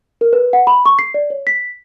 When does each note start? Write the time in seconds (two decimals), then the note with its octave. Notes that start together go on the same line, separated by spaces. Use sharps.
0.21 A#4
0.33 B4
0.53 F#5
0.67 B5
0.86 C#6
0.99 C7
1.14 D5
1.30 C#5
1.47 B6